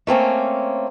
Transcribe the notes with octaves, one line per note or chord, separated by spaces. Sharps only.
A3 A#3 C4 C#4